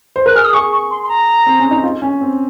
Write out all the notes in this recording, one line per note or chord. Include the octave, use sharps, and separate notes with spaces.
C5
A#4 F#6
G#4 F6
D#6
G#4 C#6
C#6
C6
C6
A#5
C4
C#4
D#4
F4
C#4
C4